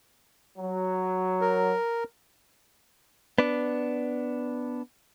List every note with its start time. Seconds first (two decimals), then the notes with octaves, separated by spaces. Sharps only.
0.58 F#3
1.41 A#4
3.38 B3 D4